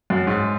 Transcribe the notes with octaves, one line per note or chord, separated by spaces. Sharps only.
F#2
G#2